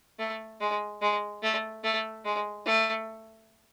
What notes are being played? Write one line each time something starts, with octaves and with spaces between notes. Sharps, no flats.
A3
G#3
G#3
A3
A3
G#3
A3